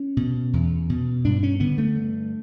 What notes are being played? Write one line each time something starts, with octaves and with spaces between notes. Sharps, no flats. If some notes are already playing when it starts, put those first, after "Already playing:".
Already playing: C#4
B2
E2
B2
G2 D4
C#4
D3 B3
A3
G2